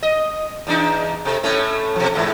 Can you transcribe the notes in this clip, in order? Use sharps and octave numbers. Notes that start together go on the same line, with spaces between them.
D#5
E2 D4 D#4
C3 A4
A2 A3 C#4
B2 F3
E2 G#2 E3